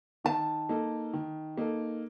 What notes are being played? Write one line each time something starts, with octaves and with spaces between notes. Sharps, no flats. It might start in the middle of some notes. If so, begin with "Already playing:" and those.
D#3 A5
A#3 D#4 A4
D#3
A#3 D#4 A4